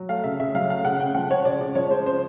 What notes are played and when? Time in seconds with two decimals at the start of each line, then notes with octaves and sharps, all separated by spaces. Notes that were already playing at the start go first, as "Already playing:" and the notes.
Already playing: F#3
0.09 A3 F5
0.24 C#3 E5
0.40 C#3 E5
0.54 F#3 F5
0.69 A3 F5
0.85 C#3 F#5
1.00 C#3 G5
1.15 F3 F#5
1.30 G#3 C#5
1.45 C#3 D5
1.60 C#3 D5
1.75 F3 C#5
1.90 G#3 C5
2.05 C#3 C5